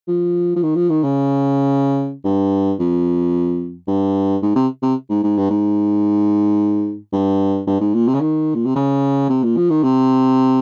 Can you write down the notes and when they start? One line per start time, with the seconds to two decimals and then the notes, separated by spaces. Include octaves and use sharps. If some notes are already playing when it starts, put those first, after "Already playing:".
0.08 F3
0.56 F3
0.63 D#3
0.76 F3
0.90 D#3
1.04 C#3
2.25 G2
2.79 F2
3.88 G2
4.42 G#2
4.56 C3
4.82 C3
5.09 G#2
5.23 G#2
5.37 G2
5.50 G#2
7.13 G2
7.67 G2
7.81 G#2
7.94 A#2
8.08 C3
8.14 C#3
8.21 D#3
8.55 A#2
8.66 C3
8.76 C#3
9.29 C3
9.43 A#2
9.57 F3
9.70 D#3
9.83 C3